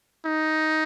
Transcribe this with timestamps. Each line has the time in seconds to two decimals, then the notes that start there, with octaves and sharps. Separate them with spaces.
0.25 D#4